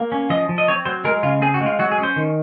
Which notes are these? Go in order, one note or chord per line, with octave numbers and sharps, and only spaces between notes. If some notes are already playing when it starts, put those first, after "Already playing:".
Already playing: A#3
C#4
F3 D#5
F3
D#5
C4 C#5
F#3 C5
G#3 A#4
C#3 F4
C4 G#4
F#4
G#3
F4
F#3 F#4
G#4
C#4
C5
D#3